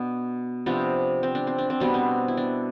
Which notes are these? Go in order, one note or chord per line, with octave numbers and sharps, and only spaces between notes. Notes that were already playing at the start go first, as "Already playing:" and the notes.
Already playing: B2 B3 D4
C3 F3 B3 D4
C4
D4
C4
D4
C4
B2 G3 B3 D4
C4
E4
D4